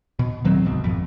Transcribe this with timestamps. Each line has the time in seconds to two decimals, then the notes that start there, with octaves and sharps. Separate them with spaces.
0.19 B2
0.45 D#1 D#3 F#3 C4
0.65 C2 G#2 B2
0.84 G#1 F2